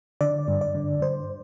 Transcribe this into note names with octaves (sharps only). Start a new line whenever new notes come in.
D3 D5
G2
D5
D3
G2 C5